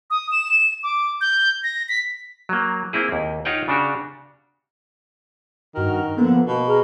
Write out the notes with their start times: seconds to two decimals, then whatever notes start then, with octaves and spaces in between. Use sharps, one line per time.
0.10 D#6
0.32 E7
0.83 D6
1.21 G6
1.63 A#6
1.89 B6
2.49 F#3 A#3
2.93 A#3 C4 E4 G#4
3.12 D#2
3.45 D#4 F4 G4 C#5 F#5 G5
3.68 C#3 D4 F#4 G4
5.75 G2 D#3 F#4 F6
6.17 D3 F3 A#3 B3
6.46 B2 A#3
6.67 G#4 A#5 F6